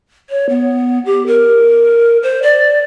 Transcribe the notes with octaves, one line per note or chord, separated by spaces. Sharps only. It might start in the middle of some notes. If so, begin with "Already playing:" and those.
C#5
B3
G4
A#4
C5
D5